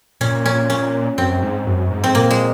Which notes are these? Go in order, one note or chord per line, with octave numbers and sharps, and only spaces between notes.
A#2 C#4
C#4
C#4
F#2 C4
G#2
F#2
G#2
C4
A#2 A#3
G#3